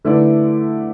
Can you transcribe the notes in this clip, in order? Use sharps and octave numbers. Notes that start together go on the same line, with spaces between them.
D3 A3 E4 B4 D5